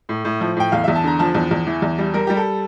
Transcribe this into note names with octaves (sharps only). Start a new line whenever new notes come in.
A2
A2
F3
A2 G5
E2 F5
E2 E5
A5
D3 A#5
F3 A5
E2
E2
E3
E2
G3
G3 A#4
G3 G4
A4